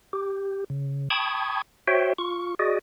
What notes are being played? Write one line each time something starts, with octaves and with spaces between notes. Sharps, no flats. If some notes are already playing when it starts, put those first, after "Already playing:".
G4
C#3
G5 A5 B5 C#6 D#6 G#6
F#4 C5 C#5 E5 G5
F4 C#6
F#4 G#4 D5 D#5